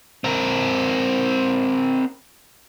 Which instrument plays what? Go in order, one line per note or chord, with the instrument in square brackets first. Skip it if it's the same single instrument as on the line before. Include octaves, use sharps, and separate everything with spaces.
[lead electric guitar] C4 A#4